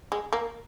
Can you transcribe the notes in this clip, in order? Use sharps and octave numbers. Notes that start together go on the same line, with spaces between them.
G#3
A#3